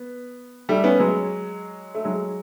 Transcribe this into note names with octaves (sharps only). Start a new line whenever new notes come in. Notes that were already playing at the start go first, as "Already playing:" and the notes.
Already playing: B3
G3 A3
B3 C#4
F#3 G#3
A3
F#3 G#3